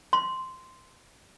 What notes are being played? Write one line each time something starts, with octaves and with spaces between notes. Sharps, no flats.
C6